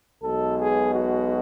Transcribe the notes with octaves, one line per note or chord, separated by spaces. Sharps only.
B1 B2 G#3 A4
G#4
F#4